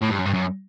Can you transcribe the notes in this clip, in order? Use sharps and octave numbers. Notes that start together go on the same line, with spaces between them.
A2
G2
F#2
G2
F#2